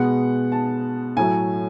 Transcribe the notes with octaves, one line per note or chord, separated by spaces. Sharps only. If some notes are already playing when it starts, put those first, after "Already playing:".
Already playing: B2 G#3 B3 F#5
A5
A2 F#3 A3 G#5